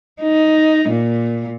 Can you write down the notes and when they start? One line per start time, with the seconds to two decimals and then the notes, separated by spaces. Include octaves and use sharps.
0.21 D#4
0.89 A#2